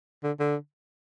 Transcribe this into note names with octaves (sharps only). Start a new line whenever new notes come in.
D3
D3